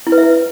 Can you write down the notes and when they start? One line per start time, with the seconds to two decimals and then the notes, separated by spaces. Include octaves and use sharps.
0.07 E4
0.12 B4
0.18 E5